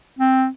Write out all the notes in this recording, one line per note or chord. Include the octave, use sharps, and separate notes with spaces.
C4